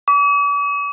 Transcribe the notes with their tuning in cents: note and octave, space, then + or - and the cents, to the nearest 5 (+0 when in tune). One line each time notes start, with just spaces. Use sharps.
D6 -45